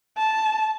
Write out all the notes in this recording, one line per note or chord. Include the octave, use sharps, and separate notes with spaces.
A5